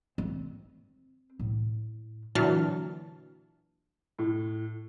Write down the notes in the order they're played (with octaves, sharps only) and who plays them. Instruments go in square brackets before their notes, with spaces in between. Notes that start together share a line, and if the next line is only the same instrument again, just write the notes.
[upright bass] C4
A2
[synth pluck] A#2 D3 E3 F#3 A5 F6
[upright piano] A2